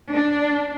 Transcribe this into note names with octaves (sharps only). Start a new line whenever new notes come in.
D4